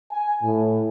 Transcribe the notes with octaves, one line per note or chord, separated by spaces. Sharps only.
G#5
A2